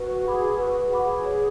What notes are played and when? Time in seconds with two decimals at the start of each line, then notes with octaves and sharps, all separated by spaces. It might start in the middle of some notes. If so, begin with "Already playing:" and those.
Already playing: F#4 B4
0.25 G#4 F#5 B5 D6
0.58 F#4 B4
0.80 F#4
0.92 F#5 B5 D6
1.03 G#4
1.25 C#5